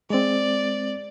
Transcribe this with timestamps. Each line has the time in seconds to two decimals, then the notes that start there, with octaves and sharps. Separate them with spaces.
0.10 G#3 C4 D5